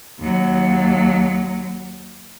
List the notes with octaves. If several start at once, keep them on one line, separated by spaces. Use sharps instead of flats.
D#2 F#3